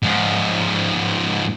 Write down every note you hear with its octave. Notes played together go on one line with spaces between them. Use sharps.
G#2 F3